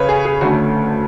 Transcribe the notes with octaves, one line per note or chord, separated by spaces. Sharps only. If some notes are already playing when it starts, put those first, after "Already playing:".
Already playing: C#3 B4 C#5
G#4
G#4
D2 D3 A3 C#4 F#4